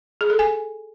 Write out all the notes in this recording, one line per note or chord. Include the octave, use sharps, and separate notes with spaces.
G#4
A4
G#5